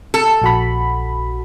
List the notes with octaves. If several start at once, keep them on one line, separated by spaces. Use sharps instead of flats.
A4
A#1 F#4 B5